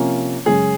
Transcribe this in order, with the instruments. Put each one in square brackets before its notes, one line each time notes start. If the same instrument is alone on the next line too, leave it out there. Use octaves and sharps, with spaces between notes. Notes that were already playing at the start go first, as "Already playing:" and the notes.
Already playing: [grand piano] C3 F3 A#3 C#4
[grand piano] F#2 C#3 G#3 C#4 [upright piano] G#4